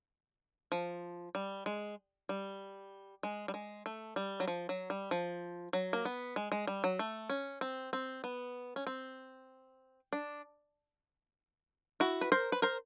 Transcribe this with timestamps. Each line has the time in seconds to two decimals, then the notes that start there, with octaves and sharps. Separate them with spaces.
0.72 F3
1.35 G3
1.66 G#3
2.29 G3
3.23 G#3
3.48 G3
3.54 G#3
3.86 A3
4.16 G3
4.40 F#3
4.48 F3
4.69 F#3
4.90 G3
5.11 F3
5.73 F#3
5.93 A#3
6.05 B3
6.36 G#3
6.52 G#3
6.67 G3
6.84 F#3
6.99 A3
7.30 C#4
7.61 C4
7.93 C4
8.24 B3
8.76 C#4
8.87 C4
10.13 D4
12.00 E4 F#4
12.21 B4
12.32 A#4 C5
12.52 B4
12.62 A#4 C5